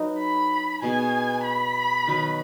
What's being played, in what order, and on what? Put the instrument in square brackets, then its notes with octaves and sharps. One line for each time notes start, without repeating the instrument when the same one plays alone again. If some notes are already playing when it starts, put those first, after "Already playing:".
Already playing: [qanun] F#3 D#4 B4
[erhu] B5
[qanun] B2 B3 G#4 [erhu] G#5
[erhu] B5
[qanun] D#3 F#3 D#4 B4